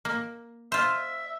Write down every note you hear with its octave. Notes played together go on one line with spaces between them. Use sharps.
A#3
F4 C5 E5